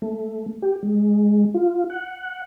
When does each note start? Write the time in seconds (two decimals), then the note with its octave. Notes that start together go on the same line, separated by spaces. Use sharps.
0.02 A3
0.62 G4
0.83 G#3
1.54 F4
1.90 F#5